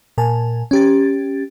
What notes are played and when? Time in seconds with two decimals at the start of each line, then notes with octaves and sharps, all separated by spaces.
0.18 A#2 A#4 G#5 A5
0.71 C#4 G4 A6